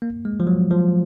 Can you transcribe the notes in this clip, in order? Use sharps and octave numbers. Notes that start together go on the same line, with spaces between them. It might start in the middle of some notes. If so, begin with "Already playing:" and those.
A#3
G#3
F3
F#3
F3